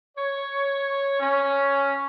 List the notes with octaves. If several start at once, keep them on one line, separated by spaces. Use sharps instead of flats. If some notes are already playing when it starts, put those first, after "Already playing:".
C#5
C#4